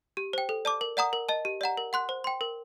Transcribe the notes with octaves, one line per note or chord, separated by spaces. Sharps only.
G4
C5 G5
A4
D5 A5 D6
A#4
D5 F#5 A#5 D#6
A#4
D#5 A5
G4
D5 F#5 A#5
A#4
F#5 C6 F#6
C5
G5 C6
A#4